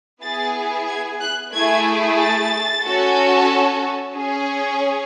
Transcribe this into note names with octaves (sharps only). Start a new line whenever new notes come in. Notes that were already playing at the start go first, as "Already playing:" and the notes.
B3 E4 G#4 A6
G#6
F#6
A3 E4 G#4 G#6
A6
C#4 F#4 A4
C#4 G#4